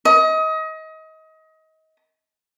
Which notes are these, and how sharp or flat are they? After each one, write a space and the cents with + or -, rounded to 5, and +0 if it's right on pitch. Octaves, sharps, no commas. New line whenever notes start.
D#5 +30